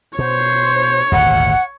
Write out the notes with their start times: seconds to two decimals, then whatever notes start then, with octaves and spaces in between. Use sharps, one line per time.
0.19 B2 C5 C#5
1.12 D#1 G#1 D2 F#5